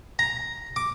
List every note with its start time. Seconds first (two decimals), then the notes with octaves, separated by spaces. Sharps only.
0.19 A#5
0.76 D6